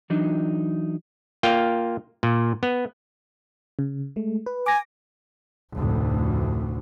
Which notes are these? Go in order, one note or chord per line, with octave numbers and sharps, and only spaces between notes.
E3 F#3 D4 D#4
A#3 F4 G5
A#2
B3
C#3
G#3 A3
B4
G#5 D6 A#6
F1 D2 A2